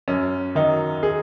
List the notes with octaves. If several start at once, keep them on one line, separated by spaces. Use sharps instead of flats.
F#2 C#4
D#3 F#3 D#4
G#4